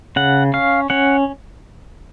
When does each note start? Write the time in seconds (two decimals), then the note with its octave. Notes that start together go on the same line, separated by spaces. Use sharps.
0.16 C#3 F#5
0.54 C#4 F5
0.90 C#4 F#5